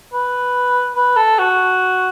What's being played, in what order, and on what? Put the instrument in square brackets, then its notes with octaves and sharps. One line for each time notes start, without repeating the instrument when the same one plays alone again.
[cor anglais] B4
B4
A4
F#4